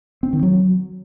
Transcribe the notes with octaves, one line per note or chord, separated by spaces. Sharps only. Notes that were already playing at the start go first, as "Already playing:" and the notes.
C4
D#3
F#3